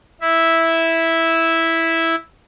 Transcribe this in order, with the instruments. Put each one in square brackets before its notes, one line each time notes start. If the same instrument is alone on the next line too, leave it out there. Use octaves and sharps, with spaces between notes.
[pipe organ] E4 E5